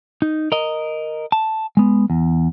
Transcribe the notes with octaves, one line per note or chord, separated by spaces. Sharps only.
D#4
A#4 D#5
A5
G#3 B3
E2